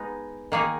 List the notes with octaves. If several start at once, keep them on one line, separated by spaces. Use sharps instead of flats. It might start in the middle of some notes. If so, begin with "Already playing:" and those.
Already playing: G#3 B3 D#4
D#3 A#3 D#4 G#4